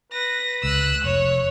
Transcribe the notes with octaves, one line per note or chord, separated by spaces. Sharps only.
B4 A#6
C#2 E6 F#6
F1 C#5